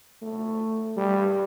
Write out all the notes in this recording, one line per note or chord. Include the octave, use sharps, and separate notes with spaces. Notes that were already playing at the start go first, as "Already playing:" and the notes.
A3
G3